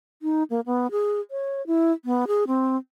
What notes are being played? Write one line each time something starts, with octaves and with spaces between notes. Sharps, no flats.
D#4
A#3
B3
G#4
C#5
E4
B3
G#4
C4